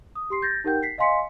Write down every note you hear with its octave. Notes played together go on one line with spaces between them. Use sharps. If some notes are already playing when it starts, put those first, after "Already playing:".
D#6
G4 C6 C7
G6 A6 A#6
D#4 G4 A#4 F#5 G5 G6
B6 C7
D#5 F5 G#5 C6 B6 C#7